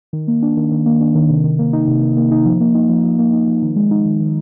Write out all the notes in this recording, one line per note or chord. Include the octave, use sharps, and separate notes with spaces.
D#3
A#3
D4
D#3
D#3
A#3
D4
D#3
C3
D#3
A#3
D#4
C3
D#3
A#3
D#4
F3
A#3
D#4
F3
F3
A#3
D#4
F3
D#3
G#3
D#4
D#3
D#3